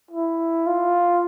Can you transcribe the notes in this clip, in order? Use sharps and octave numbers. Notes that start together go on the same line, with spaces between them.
E4
F4